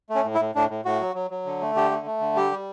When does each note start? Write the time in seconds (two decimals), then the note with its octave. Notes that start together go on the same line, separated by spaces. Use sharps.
0.10 A3
0.15 C#4
0.24 A2
0.35 E4
0.40 A2
0.55 A2 D4
0.70 A2
0.85 A2 F#4
1.01 F#3
1.15 F#3
1.31 F#3
1.45 D3
1.61 A3
1.75 D3 G4
1.90 A3
2.06 A3
2.20 D3
2.36 G3 G4
2.51 G3